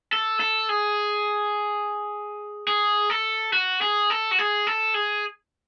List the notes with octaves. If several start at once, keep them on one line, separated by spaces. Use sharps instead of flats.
A4
A4
G#4
G#4
A4
F#4
G#4
A4
F#4
G#4
A4
G#4